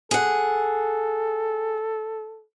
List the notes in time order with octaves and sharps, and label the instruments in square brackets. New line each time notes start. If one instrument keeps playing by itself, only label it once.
[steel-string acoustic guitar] G#4 F#5 [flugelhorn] A4